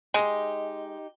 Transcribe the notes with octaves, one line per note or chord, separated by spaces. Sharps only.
G#3 D#4 G4